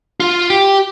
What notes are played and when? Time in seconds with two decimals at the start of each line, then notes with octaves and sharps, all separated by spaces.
0.20 F4
0.50 G4